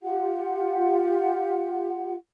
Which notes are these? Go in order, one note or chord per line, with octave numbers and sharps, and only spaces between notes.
F4 G4 F#5